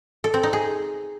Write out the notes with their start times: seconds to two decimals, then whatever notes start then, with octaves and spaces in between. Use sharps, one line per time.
0.24 A4
0.34 C4
0.43 D#4
0.53 G#4